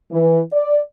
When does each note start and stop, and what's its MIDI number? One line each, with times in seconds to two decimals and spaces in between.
0.12 0.39 52
0.51 0.78 74